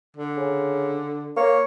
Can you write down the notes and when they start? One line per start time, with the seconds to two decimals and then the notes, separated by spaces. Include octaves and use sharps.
0.17 D3
0.37 C#3
1.37 A#3 C#5